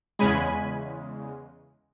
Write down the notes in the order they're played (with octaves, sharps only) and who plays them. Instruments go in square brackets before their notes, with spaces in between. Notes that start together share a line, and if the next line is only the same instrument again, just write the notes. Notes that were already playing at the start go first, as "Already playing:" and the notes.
[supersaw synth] E2 C#3 G#3 G#5 B5